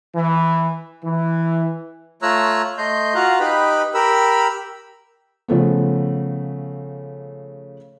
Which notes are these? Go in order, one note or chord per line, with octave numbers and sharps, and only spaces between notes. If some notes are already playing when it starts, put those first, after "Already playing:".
E3
E3
A3 F4 C#5 A#5 E6 F#6
A3 D#5 C6 G6
F4 F#4 F5 A#5 F#6
D#4 G4 B4 B5
G4 A#4 B5 E6
C#3 F3 A3 B3